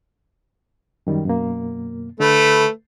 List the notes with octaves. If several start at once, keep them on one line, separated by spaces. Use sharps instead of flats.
F#2 D#3 G3
F#2 B2 A#3
D3 A3 B4